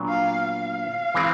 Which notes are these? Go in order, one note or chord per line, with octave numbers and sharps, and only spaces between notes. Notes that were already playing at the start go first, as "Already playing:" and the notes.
Already playing: A#2 F#3 B3 D4
F5
F5
E3 G#3 C4